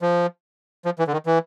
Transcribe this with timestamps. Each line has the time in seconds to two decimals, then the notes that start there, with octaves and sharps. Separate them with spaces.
0.02 F3
0.85 F3
0.99 E3
1.07 D3
1.13 D#3
1.26 E3